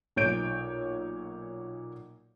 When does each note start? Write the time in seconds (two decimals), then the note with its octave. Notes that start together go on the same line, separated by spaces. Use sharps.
0.16 B1 A#2 C#5 G6 D7